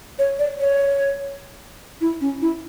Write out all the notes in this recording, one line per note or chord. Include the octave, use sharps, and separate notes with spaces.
C#5
D5
C#5
E4
C#4
E4